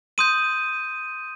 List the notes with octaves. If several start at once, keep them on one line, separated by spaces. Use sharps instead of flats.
C6 D#6 G6 D#7